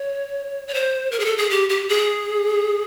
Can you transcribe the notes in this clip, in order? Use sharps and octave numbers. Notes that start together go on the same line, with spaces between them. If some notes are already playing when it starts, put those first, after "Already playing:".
Already playing: C#5
C#5
C5
A#4
G#4
A4
G#4
G4
G4
G#4